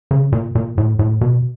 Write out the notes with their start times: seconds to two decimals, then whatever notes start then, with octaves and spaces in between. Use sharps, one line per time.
0.11 C#3
0.32 A#2
0.55 A#2
0.78 A2
0.99 A2
1.21 B2